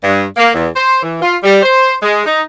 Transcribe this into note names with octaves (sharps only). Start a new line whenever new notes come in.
G2
A#3
E2
C5
E3
F4
G3
C5
G#3
D#4